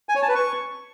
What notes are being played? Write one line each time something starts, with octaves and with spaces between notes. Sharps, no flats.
G#5
C#5
A5
B4
C#6